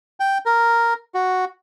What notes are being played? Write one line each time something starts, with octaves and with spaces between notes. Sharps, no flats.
G5
A#4
F#4